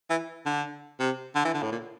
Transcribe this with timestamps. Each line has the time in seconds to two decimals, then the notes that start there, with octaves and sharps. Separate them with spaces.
0.10 E3
0.46 D3
1.00 C3
1.35 D3
1.45 E3
1.54 D3
1.62 A2
1.72 A#2